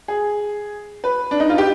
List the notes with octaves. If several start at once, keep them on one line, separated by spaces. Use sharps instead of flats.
G#4
B4
D4
D#4
F4
G4